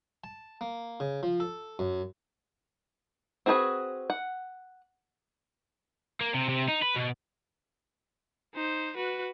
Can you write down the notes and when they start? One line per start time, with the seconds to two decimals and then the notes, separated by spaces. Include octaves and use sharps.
0.24 A5
0.61 A#3
1.00 C#3
1.23 F3
1.40 A4
1.79 F#2
3.46 C4 F#4 G#4 A#4 B4
4.10 F#5
6.21 A#3
6.34 C3
6.49 C3
6.68 D#4
6.82 B4
6.96 B2
8.54 D#4 C5
8.97 F#4 B4